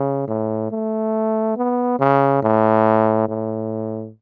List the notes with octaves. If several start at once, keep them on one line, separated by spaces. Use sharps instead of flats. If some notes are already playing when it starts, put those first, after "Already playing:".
Already playing: C#3
A2
A3
B3
C#3
A2
A2